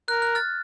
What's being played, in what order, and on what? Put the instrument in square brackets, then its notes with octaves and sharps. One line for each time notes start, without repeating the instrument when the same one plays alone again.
[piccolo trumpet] A#4 [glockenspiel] F#6
[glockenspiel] F#6
F6 A6